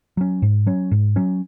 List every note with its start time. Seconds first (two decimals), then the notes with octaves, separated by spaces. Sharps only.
0.17 F#3 C#4
0.42 G#2
0.66 F#3 C#4
0.92 G#2
1.16 F#3 C#4